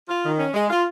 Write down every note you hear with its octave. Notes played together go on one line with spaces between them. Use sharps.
F4
D#3
C#4
G#3
F4